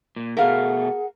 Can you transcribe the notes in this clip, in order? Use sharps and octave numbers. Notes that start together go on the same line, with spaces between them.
A#2
B2 A3 G#4 A#4 F5 F#5